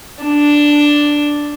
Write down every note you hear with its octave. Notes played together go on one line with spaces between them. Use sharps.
D4